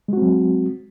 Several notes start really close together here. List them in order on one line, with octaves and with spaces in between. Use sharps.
G#3 F#4 C4 F#3